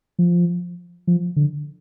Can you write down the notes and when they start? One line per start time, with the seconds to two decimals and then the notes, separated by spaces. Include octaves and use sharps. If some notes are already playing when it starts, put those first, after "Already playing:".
0.19 F3
1.07 F3
1.36 D3